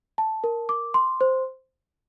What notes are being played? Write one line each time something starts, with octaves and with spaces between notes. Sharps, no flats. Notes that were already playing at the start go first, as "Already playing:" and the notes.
A5
A#4
D6
C6
C5